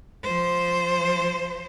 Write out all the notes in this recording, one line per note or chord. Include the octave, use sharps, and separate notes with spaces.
F3 C5